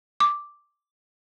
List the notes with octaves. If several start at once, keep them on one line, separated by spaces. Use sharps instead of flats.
D6